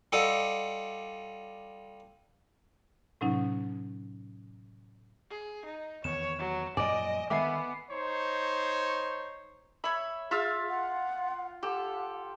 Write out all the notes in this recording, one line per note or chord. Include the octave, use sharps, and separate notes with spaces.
G3 F4 A4 D5 D#5 F#5
A2 C3 F#3 C#4 D#4
G#4
D#4
E2 D#3 B3 C#5 E7
F#3
F#2 A#2 F3 D5 D#5 G#5 D7
D3 D#3 B3 E5 G#5 D6 C7
D#4 C5 C#5
C#5 E5 B5
F4 G#4 E5 F5 E6
F#5
G4 A4 F#5